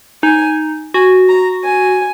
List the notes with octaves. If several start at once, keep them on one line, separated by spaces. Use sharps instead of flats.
D#4 G#5
F#4 G#5
A#5
G#5